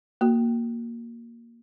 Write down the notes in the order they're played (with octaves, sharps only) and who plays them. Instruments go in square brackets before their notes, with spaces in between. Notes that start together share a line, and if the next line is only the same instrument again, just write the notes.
[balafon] A#3 F#4